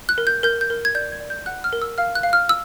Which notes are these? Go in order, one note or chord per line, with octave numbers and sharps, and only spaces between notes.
F#6
A#4
G6
A#4 G6
G6
A#4
G#6
D5 G6
G#6
D5
G6
F#5 F#6
F6
A#4
E6
F5 F6
F#6
F5
F6
E6